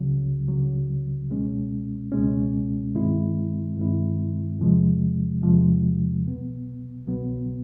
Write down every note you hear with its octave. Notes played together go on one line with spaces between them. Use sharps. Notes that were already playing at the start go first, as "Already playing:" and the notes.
Already playing: C#2 C#3 F#3
C#2 C#3 F#3
C#2 B2 G#3 C#4
C#2 B2 G#3 C#4
G2 D#3 G#3 C4 E4
G2 D#3 G#3 C4 E4
E2 C3 F3 G#3
E2 C3 F3 G#3
C2 B2 F#3 B3
C2 B2 F#3 B3